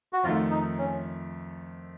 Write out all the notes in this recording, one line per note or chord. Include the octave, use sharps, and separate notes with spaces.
F#4
F2 D#3 A3 F4
D#4
C#4